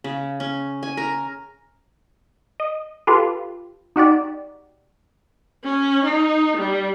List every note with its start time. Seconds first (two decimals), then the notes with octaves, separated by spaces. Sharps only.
0.04 C#3
0.40 C#4
0.83 G#5
0.97 A#4
2.60 D#5
3.07 F4 G4 A4 B4
3.96 D#4 F#4 G4 D5
5.64 C#4
6.04 D#4
6.57 G3